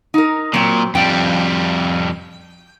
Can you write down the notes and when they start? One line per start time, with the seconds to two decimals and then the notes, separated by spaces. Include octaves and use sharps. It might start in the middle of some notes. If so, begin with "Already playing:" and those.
0.14 D#4 A#4
0.54 A#2 F#3 C4
0.95 F2 G3 G5